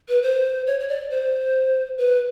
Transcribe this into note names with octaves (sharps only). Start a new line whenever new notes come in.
B4
C5
C#5
C#5
D5
C5
B4